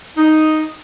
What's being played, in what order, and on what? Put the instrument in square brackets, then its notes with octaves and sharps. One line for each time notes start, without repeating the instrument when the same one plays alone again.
[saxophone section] D#4